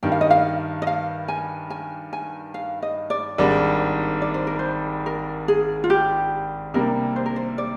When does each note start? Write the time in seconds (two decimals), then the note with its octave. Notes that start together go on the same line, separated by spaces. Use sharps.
0.03 G2 D#3 G3 G5
0.12 F5
0.21 D#5
0.30 F5
0.82 D#5
0.87 F5
1.28 G#5
1.70 G#5
2.13 G#5
2.54 F5
2.82 D#5
3.10 D5
3.38 G#1 G#2 G3 D4 D5
4.22 D5
4.34 C5
4.47 A#4
4.59 C5
5.06 A#4
5.48 G#4
5.84 F4
5.90 G4
6.74 C3 G3 A#3 D4 G4 A#4
7.16 C5
7.26 A#4
7.36 C5
7.58 D5